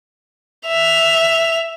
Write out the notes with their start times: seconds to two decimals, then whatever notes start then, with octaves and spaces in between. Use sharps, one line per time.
0.67 E5 F7